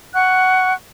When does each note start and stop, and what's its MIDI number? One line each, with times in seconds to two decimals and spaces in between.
0.14 0.73 78
0.14 0.73 85
0.14 0.73 90